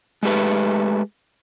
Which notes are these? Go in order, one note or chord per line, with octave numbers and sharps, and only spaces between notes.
G#3 A3 G4 B4